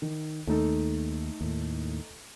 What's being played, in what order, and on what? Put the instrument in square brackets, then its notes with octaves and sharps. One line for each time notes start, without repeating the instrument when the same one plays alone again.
[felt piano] D#3
[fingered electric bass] D#2 [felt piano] A3 D#4 A4
[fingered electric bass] D#2 A2